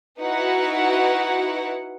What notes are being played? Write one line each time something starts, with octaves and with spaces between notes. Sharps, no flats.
D#4 E4 F#4 B4 F#5